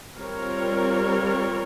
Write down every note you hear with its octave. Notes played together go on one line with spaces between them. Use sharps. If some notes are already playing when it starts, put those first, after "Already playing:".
G3 C4 F4 A#4 C#5